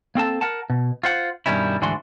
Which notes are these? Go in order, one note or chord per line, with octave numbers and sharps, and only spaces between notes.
A#3 C4 A4 A5
A#4 F#5 A5
B2
F4 C5 F#5
G2 B2 D#3 G3 C#4 E4
D2 G#2 E3 D4 F#4 C6